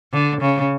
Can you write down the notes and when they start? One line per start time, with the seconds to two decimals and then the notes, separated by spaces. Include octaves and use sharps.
0.13 D3
0.41 C#3